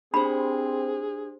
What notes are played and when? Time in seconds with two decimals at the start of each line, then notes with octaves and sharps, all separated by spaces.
0.14 C4 D4 G4 G#4 C5 B5